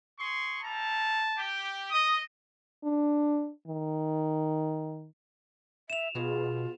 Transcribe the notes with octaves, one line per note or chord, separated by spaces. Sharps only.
G#4 C6 C#6
G3 E4 A5 A#5
G4
D#5 D#6
D4
D#3
E5 E7 F7
B2 B3 F4 F#4 G#4